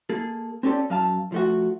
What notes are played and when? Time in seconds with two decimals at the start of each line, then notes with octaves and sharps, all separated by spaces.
0.09 A#3 G#4 A4
0.63 C4 C#4 G4 A4 D5
0.90 F#2 F5 A5
1.32 F3 A3 F#4